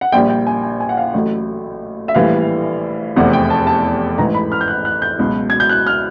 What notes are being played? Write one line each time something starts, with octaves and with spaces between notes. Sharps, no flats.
F#5
A#1 A#2 G3 G5
G5
G#5
G#5
G#5
F#5
F5
A1 A2 F#3
E5
A#1 A2 E3 G3 F5
F1 E2 C3 F#5
G5
A5
A5
A1 G#2 E3 A#5
B5
F6
G6
F#6
F#6
G6
C#2 B2 F#3
G#6
G6
F#6
F6